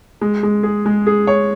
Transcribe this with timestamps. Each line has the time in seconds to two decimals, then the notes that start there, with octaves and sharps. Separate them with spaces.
0.21 G#3
0.43 G#3
0.63 G#4
0.86 G#3
1.07 G#4
1.27 C#5